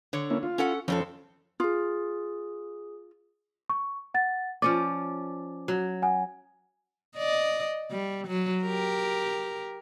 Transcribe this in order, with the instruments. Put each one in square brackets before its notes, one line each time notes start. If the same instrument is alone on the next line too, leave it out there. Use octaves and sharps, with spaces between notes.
[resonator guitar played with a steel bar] D3 C#5
[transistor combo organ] A#3 C#4 E4
F4
[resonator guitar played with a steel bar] C#4 A4 F#5
[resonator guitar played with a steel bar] F2 C4 A4 [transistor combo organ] F3 C#4
[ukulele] F4 [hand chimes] G#4 D#6
[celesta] C#6
F#5 A6
[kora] F3 C#4 D5 [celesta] D6
[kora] F#3
[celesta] F#5 G#5
[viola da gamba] D5 D#5
G3
F#3
G4 A#4